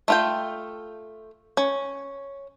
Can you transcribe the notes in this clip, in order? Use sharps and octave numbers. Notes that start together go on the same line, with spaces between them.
A3 F4 G5
C#4